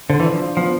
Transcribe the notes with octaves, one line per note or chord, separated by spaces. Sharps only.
D3 C5
E3
F3 D4
F4
F3 B3